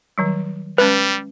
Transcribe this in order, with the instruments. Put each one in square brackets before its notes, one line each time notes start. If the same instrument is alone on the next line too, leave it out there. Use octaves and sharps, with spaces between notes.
[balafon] D#3 F#3 G3
[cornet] G3 [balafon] G#3 C#4 [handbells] B4